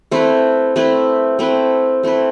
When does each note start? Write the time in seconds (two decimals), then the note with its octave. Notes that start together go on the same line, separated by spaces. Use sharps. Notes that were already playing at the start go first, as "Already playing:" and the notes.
0.11 A3 C4 E4 B4
0.76 A3 C4 E4 B4
1.39 A3 C4 E4 B4
2.03 A3 C4 E4 B4